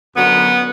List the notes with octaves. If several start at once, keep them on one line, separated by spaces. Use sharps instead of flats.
F#2 D3 F#3 B3